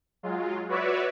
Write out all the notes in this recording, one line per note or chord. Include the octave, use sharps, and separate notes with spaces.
F#3 G#3 F4
F#4 B4 C#5 D5 E5